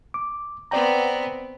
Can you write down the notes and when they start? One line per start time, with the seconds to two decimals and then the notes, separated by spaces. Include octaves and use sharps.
0.14 D6
0.71 B3 C4 D5 G5 A#5